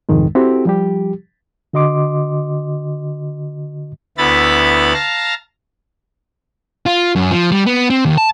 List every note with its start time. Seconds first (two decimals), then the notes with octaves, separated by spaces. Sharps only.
0.09 C2 F2 G#2 D#3 G#3
0.35 C4 E4 F#4 G4 A4
0.65 F3 G3 G4
1.73 D3 F#4 D#5 C6 D6
4.18 D2 B3 E4 B5 A6
4.93 F5 A5 A#5
6.86 F4
7.16 F#2
7.31 F3
7.52 G3
7.66 B3
7.90 C4
8.05 D#2
8.18 A5